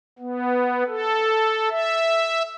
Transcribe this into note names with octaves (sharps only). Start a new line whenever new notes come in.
B3
A4
E5